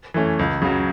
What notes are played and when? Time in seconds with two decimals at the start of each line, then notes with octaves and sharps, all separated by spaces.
0.14 E3 A3 C#4
0.39 C#2
0.62 C#3 F#3